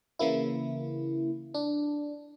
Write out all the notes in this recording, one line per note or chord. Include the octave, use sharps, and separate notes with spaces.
C#3 E3 A#3 E4
D4